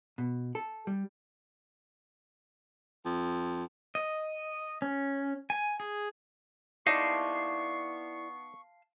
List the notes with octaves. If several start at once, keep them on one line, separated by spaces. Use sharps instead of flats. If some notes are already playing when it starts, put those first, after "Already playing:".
B2
A4
G3
F2
D#5
C#4
G#5
G#4
B3 D#4 E4 D5 F5 A5 C6 C#6